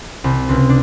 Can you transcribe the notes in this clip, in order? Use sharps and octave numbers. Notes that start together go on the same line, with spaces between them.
C2
C#2
D4